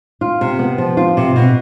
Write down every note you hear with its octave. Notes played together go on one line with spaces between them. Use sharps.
F4
C3
B3
F3
F4
C3
B2